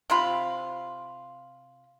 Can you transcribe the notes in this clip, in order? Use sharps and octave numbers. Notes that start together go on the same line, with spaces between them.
C3 C4 F4 B5